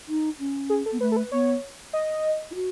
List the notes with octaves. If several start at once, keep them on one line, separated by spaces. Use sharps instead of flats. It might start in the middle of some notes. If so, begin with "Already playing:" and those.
D#4
C#4
G#4
A4
B3
A3 B4
A4
B4
B3 C#5
D#5
E4
F#4